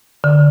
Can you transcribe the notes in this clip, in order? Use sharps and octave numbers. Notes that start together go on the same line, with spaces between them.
D3